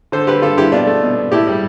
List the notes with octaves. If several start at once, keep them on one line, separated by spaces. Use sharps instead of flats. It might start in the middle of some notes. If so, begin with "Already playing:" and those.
D3 A4 C5
D3 G4 B4
D3 F4 A4
D3 E4 G4
B2 D4 F4
A3
B2
B2
A2 E4 G4
G3